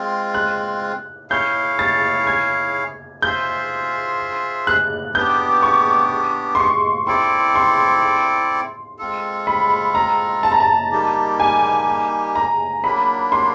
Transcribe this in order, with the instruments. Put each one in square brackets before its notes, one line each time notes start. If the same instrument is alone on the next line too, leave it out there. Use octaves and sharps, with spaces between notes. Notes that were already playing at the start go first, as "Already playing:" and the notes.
Already playing: [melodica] G#3 C4 F4
[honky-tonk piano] F#6
[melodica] E4 G#4 C#5 F5 [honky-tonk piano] G6
[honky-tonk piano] A6
G#6
[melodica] F4 G#4 C5 E5 [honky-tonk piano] G6
[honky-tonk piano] F#6
[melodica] B3 D4 G4 [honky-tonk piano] G6
[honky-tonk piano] C#6
C6
C#6
[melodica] C4 E4 A4 D5 [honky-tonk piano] C6
[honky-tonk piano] C6
[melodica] G#3 C4 F4 A4
[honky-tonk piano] B5
A#5
A5
A#5
A5
[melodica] G3 A#3 D#4 G4
[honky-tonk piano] G#5
A#5
[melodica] F#3 A#3 D4 [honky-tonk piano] B5
[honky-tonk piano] C6